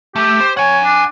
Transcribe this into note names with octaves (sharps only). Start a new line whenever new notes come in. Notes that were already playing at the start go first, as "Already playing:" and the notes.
A3 G4
C5
C#5 F#5 G#5
D4